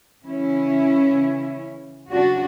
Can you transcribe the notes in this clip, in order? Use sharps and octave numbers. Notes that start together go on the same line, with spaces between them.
C#3 E3 C#4 E4
C#3 F#3 D4 F#4